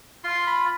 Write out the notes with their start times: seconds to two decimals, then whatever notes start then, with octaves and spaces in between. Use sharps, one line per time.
0.24 F4 C6
0.47 B5